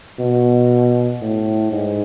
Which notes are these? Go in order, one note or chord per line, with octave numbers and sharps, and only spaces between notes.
B2
A2
G#2